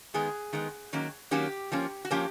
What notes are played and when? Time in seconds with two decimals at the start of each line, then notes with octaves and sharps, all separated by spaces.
0.14 D#3 G#3 B3 G#4
0.53 D#3 G#3 B3
0.93 D#3 F#3 A#3 C#4
1.31 D#3 F#3 A#3 C#4 G4
1.72 F3 A#3 C#4
2.05 F#4
2.11 F3 A#3 C#4 G4